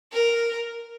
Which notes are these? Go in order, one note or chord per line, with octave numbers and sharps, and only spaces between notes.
A#4